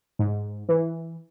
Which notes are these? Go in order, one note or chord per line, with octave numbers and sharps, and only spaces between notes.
G#2
E3